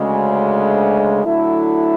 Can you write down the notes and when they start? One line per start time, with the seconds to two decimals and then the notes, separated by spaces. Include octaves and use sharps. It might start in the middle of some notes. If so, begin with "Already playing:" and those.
Already playing: D2 C#3 G#3
1.23 D3 F#3 A3 E4